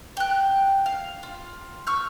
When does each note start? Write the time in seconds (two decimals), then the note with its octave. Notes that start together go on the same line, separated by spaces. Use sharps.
0.17 G5 F#6
0.86 F5
1.23 F4
1.87 C#6 E6 F6 G6